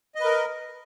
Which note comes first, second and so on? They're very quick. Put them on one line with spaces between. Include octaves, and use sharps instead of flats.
D#5 B4 A#4